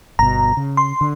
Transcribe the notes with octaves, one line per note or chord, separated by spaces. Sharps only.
G1 B2 A#5
C#3
C6
D3